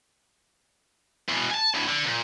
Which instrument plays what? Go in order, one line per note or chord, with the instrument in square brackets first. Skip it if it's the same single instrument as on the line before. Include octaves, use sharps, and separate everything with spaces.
[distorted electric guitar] E2 B2
G#5 A5
D2 A2
D3
A#2